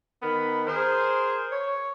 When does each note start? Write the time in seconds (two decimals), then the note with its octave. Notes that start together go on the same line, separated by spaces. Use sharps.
0.23 D#3 B3 A#4 B5
0.67 G#4 A#4 C5
1.52 C#5